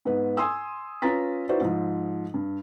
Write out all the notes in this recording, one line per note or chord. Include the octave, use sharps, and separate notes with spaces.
G#2 B3 B4
G#5 C6 D#6 E6
C#4 F4 B4 A#5 A6 B6
D#4 E4 F#4 B4 C5 D5
G#2 F3
G2